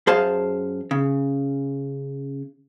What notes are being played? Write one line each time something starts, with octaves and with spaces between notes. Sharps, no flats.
F#2 G#4 C5 F5 A5
C#3